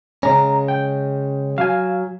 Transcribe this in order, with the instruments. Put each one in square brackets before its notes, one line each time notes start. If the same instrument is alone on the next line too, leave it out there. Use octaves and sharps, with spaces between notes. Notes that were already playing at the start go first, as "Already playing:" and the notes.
[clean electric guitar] C#3 G#3 C#4 [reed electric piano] A#5
[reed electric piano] G5
[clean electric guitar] F#3 [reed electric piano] F5 G#5